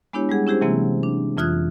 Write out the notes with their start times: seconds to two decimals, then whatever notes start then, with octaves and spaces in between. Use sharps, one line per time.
0.13 G#3 B3 D4 E4 G4 C#5
0.29 G3 G#3 G#4 F#5
0.47 C#4 E4 G4 G#4 C5
0.61 C3 E3 F#3 G#3 A#3 C4
1.03 D4
1.37 F2 E3 F4 D#6 F#6 G#6